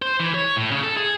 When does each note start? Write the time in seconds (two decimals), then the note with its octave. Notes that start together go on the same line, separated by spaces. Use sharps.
0.02 C5
0.20 E3
0.34 C#5
0.56 A2
0.71 C#3
0.83 A4
0.97 G#4